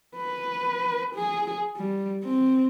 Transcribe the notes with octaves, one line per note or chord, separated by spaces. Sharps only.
B4
G#4
G3
C4